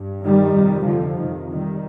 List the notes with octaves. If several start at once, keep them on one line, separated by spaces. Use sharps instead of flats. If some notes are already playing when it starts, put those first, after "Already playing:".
Already playing: G2
D#3 G3
F2 C3
D3 F3
F2 C3 D#3
D#3 G3